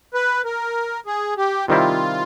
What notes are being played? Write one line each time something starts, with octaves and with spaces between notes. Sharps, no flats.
B4
A#4
G#4
G4
C3 D#3 G3 C4 E4 F4